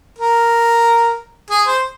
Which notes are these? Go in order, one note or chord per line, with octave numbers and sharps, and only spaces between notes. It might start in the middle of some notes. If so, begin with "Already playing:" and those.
A#4
G#4
C5